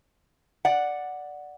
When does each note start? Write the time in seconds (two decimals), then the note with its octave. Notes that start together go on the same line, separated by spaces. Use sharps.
0.65 D5 F#5